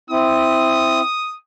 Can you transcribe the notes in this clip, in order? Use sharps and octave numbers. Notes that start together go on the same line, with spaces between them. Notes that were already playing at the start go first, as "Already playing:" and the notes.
C4 E4 D#6